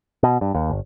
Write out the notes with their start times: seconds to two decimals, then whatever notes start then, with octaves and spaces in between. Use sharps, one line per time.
0.23 B2
0.41 G2
0.55 D#2
0.70 G1